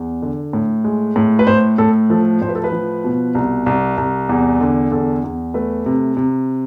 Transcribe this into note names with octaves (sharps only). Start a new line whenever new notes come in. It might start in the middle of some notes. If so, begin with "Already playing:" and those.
Already playing: E2
D3
A2
G#3
A2
B4
A2 C5
A2 A4
F3 A4
A2 C5
B4
A4
B4
F3
B2
C2
C2
C2
E2
D3
E2 A4
E2
A3 B4
C3
C3